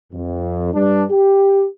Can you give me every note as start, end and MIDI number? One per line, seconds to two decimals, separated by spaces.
0.13 0.73 41
0.74 1.04 43
0.74 1.04 62
1.10 1.65 67